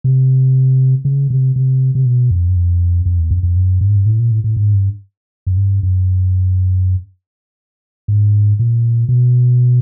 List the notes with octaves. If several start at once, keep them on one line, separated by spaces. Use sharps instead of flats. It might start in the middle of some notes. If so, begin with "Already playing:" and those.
C3
C#3
C3
C3
C3
B2
F2
F#2
F2
F2
E2
F2
F2
F#2
G2
G#2
G2
A2
A#2
A2
A2
G#2
G2
F#2
G2
F#2
G#2
A#2
B2